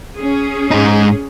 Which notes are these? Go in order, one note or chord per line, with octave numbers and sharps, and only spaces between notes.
C#4 G#4
G#2 D#4